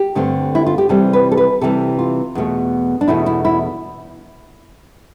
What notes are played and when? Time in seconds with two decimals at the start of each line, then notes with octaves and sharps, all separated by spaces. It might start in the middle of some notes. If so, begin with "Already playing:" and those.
Already playing: G4
0.15 G2 D3 A3 C4
0.55 E4
0.66 F4
0.78 G4
0.89 C3 E3 G3 C4 A4
1.13 B4
1.32 A4
1.37 B4
1.61 C3 E3 G3 C4 A4
1.99 F4
2.35 E2 B2 A3
3.01 D4
3.08 E2 B2 A3 E4
3.26 E4
3.45 E4